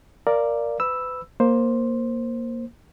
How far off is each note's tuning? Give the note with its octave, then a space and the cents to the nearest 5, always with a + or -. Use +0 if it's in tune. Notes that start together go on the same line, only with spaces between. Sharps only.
A#4 +0 D5 +0 F5 -20
B4 +35 B5 +0 E6 +0
A#3 +5 C5 +10